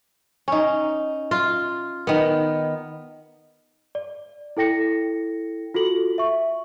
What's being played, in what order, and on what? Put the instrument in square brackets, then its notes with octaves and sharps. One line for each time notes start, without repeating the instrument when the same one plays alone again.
[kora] C#4 D#4
F4
D#3 B3
[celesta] D5
E4 A4 G5 A#6 C#7
F4 F#4 A4 F#7
E5 C#6